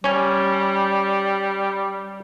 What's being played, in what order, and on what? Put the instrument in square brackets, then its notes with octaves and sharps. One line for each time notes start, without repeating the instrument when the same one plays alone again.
[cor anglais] G3 [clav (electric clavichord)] C#4 G#5